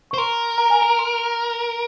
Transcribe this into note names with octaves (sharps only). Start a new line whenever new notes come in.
C#6
C5
A#4 C6
A#5
G#5
A#5
C6